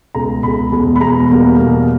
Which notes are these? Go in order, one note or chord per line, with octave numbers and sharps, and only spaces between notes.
C#2 B2 G#3 A#5
C#2 B2 G#3 B5
E2 B2 G#3
B5
E2 B2 G#3 A#5
E2 B2 G3 A#3
E2 B2 G3 A#3